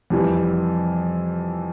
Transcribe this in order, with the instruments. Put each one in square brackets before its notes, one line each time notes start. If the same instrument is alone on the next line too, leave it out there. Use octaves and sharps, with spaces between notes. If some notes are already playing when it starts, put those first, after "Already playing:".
[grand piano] F2 C3 E3 G3